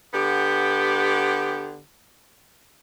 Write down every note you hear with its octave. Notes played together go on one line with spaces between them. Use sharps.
D3 B3 G4